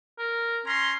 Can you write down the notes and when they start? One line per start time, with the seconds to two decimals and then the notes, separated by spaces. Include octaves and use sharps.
0.18 A#4
0.66 C#4 A#5 C6